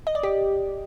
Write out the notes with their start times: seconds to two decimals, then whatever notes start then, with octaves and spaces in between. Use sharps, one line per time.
0.07 D#5
0.15 D5
0.23 G4